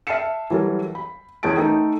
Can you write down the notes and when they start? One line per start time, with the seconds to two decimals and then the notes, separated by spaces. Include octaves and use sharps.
0.07 E5 A5 F6 C7 C#7 E7
0.50 E3 F#3 G3 A4 A#4
0.95 B5
1.43 E2 C#4 G#4 A5 D7
1.57 A3 D#4 A4 G5